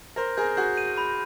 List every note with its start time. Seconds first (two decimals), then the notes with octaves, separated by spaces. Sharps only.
0.16 A#4 C5 A#6
0.37 G#4 A#4 G6
0.57 F#4 G#4 G6
0.78 D#7
0.98 B5